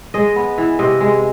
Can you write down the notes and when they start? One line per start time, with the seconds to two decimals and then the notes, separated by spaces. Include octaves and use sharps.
0.14 G#3 D#5
0.36 B3
0.58 E3
0.79 C3 D#5
1.01 G#3